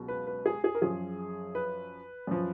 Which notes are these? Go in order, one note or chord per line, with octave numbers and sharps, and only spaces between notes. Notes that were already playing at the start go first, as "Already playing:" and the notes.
Already playing: C#2 B2 F#3
B4
B4
G#4
G#4
A#4
F#2 F3 G#4
B4
F#2 F3